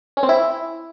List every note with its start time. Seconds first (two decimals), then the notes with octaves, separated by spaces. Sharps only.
0.17 C#4
0.23 C4
0.29 E4